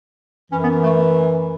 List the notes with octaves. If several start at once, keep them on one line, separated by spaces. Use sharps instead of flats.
F#2 E3 C#4
B3
A3